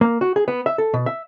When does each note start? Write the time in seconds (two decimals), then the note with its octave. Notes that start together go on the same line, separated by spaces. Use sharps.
0.01 A#3
0.21 F#4
0.36 G#4
0.48 B3
0.66 E5
0.78 A4
0.94 B2
1.06 E5